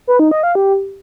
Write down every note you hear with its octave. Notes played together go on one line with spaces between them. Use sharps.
B4
D#4
D#5
F5
G4